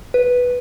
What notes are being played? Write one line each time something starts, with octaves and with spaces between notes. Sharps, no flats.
B4